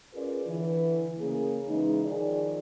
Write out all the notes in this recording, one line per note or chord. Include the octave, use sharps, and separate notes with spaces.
C#4 F4 G#4 A#4 B4 D5
D3 E3
C#3 A#3 G#4
C#3 E3 G#3 D#4
D#3 F3 G#4 D5